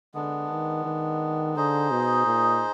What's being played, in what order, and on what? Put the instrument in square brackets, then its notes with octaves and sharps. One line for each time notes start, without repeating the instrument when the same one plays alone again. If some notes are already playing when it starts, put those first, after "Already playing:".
[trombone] D3 [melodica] G#3 B3 D4
[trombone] D#3
D#3
[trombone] D3 [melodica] D#4 G#4 C5 D#5
[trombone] B2
A#2